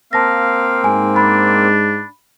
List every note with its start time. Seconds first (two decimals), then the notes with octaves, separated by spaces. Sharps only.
0.13 A#3 C4 F5 A5 A#6
0.84 G#2 G#3 G#5
1.16 D4 B5